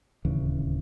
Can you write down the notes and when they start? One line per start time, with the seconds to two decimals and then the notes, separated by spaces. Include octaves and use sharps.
0.25 D1 D#2 C#3 E3